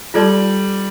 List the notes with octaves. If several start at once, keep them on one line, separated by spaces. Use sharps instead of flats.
G3 F4 A4 D5 A5 C6